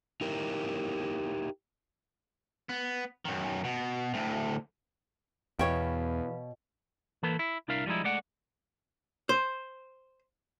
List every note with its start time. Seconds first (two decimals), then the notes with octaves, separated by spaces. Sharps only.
0.21 D#4 E4 G4 A#4
2.69 B3
3.25 F#2 D#3
3.64 B2
4.14 D2 A2
5.59 E2 B2 B4 C#5 F5 G5 B5
7.23 E3 A#3 A4 B4
7.39 E4
7.68 C2 D4 E4 A#4 E5 F5
7.86 F3 G3 G#3 D#4 E4
8.04 G#3 A3 D5 F#5
9.29 C5